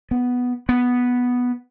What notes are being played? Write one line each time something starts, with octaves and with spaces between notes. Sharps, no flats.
B3
B3